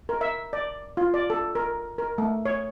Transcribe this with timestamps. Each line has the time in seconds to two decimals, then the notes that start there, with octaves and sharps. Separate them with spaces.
0.09 A#4
0.21 E5
0.53 D5
0.97 F4
1.14 D5
1.30 A4
1.55 A#4
1.98 A#4
2.18 A3
2.45 C#5